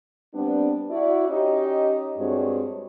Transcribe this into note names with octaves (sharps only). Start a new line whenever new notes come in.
G3 B3 C4 D4
E4 F#4 D5
C#4 D#4 G4 C#5 D#5
G2 G#3 C4 D4 F#4 C#5